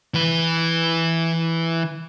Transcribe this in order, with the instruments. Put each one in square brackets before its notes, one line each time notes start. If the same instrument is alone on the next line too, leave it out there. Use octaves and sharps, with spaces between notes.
[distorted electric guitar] E3 B4